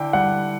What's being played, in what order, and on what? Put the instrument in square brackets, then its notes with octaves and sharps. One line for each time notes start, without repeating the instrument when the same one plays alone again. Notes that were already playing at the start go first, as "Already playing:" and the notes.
Already playing: [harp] D3 E4 [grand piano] G5
[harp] G3 [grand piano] F#5